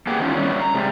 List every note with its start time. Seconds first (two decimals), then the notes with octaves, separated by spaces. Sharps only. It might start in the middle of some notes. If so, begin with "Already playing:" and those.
0.07 A#3 B3 G4 G#4
0.19 D#3 E3 F#3 C4 C#4 F4
0.36 D3 G3 A3 B3 C#4
0.60 A#5
0.75 C3 G3 G#3